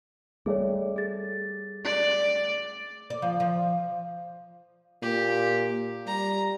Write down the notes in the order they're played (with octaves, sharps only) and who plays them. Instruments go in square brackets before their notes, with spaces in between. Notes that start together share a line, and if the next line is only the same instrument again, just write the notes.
[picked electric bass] G3 A3 [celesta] G#4 C#5
[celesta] G#4 A6
[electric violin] D5
[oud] D5
F3
F3
[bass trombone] A#2 [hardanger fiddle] G4
[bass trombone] G3 [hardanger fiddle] A#5